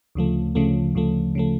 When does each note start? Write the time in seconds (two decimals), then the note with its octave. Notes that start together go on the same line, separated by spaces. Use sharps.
0.15 D2 C#3 F3 A3
0.55 D2 C#3 F3 A3
0.95 D2 C#3 F3 A3
1.35 C#3 F3 A3